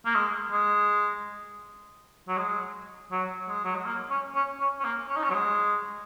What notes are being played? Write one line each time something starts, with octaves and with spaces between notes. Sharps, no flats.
A#3
G#3
G#3
F#3
G#3
F#3
G#3
F#3
G#3
A#3
C#4
C#4
C#4
C#4
A#3
C#4
D#4
C#4
F#3
G#3